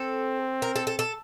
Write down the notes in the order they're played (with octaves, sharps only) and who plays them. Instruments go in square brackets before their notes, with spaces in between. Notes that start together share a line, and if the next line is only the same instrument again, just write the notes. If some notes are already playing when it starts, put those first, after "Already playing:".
Already playing: [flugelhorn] C4 [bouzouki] A4
[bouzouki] A#4
A4
A4
A4